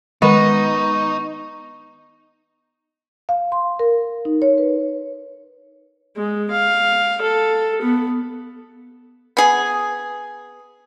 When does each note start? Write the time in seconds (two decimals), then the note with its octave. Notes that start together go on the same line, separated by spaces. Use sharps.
0.22 D#3 G#3 B3 D#4 C#6
3.29 F5
3.52 C6
3.79 A#4
4.25 D#4
4.42 C#5
4.58 B4
6.17 G#3
6.50 F5
7.21 A4
7.82 B3
9.37 B3 G#4